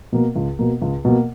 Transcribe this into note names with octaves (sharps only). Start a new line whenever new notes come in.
B2 A#3
C#2
B2 A#3
C#2
B2 A#3